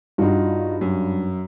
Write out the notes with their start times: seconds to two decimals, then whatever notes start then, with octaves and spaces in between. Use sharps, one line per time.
0.18 G2 D#4 F4 F#4
0.81 F#2